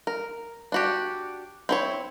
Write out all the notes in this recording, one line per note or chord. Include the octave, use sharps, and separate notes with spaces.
A#4
D4 F#4 G4
C4 E4 C#5